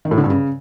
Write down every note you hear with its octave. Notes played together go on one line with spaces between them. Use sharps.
D#3
A2
D3
G2
C#3